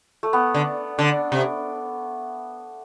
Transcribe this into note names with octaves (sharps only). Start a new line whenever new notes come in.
A3
B3
D3
D3 D4
C3